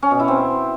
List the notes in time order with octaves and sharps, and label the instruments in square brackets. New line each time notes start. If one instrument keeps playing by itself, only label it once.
[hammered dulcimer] C#4
B2
E4
C4